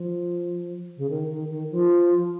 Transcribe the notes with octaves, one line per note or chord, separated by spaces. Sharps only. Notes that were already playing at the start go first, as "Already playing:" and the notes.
Already playing: F3
C#3
D#3
D#3
D#3
F3